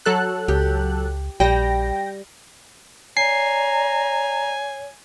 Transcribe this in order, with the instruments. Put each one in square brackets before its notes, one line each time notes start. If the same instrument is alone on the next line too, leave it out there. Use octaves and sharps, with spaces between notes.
[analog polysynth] F#3 A4 F#6
[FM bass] C#2 [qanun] G4
[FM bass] A#1 [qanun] G3 [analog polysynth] G5 A#6
[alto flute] C#5 [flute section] D5 A#5 [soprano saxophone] G#5 [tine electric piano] C7